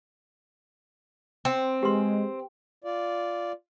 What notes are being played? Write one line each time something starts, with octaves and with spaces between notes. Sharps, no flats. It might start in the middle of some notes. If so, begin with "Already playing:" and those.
C4 G5
G#3 G4 B4 C6
F4 D5